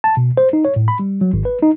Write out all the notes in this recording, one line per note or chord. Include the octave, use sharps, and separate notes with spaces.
A5
B2
C5
D#4
C#5
A2
B5
G3
F#3
G#1
B4
D#4